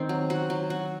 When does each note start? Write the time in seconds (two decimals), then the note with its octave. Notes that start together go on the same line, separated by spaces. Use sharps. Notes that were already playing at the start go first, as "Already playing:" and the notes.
Already playing: D#3 C4
0.09 F#3
0.30 F#4
0.50 F#3
0.70 F#4